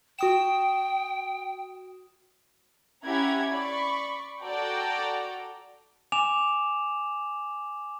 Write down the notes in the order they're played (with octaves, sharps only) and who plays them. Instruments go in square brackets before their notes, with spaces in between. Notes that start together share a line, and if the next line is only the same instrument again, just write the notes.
[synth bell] F#4 D#6 E7 [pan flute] G5
[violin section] C#4 E4 G4 F#5 A#5 G#6
D5 B5 C#6
F#4 A4 D5 G5 A#5
[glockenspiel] G#5 D6 E7 F7